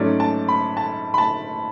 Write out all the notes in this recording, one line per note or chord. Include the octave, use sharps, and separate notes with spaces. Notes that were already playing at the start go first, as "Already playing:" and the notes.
Already playing: G#2 F#3 A3 C#4 D5
A5
B5
A5
B5
A5